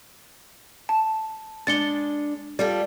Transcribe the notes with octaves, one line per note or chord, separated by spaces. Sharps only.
A5
G#3 D4 A6 C#7 G7
G3 F4 A4 D5